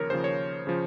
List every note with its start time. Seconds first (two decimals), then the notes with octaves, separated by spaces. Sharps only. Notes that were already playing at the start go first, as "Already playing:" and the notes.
Already playing: D#2 C#3 F3 A#4 C#5
0.10 D#2 C#3 F3 C5
0.24 C#5
0.67 C#3 F3